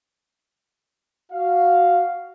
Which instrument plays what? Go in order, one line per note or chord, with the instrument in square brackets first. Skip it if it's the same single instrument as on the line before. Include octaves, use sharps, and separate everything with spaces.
[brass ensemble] F#4 F5